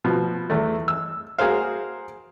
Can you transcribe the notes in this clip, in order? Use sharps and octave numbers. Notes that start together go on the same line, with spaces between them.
B2 F3
E2 A3
E6
F#4 G#4 A#4 C5 F5